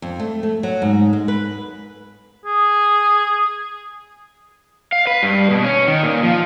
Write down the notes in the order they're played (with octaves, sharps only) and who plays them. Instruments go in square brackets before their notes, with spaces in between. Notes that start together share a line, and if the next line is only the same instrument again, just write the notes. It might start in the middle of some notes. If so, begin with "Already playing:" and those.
[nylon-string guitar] F2
A3
A3
F#3
G#2
G#3
B4
[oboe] G#4
[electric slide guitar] F5
B4
G2
B2
C#4
D#3
A#2
F3